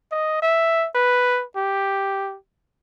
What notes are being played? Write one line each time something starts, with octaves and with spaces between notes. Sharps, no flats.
D#5
E5
B4
G4